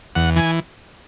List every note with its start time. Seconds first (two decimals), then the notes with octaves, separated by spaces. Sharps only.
0.15 E2 F#5
0.36 E3 G#5